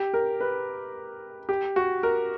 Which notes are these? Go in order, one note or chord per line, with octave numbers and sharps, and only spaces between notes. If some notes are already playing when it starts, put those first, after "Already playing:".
Already playing: G4
A#4
B4
G4
F#4
A#4